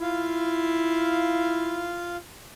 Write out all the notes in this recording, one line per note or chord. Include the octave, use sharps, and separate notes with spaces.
E4 F4 F5